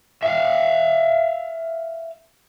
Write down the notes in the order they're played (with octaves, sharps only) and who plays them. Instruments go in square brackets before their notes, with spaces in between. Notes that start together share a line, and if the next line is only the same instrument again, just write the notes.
[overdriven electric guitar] E5 F5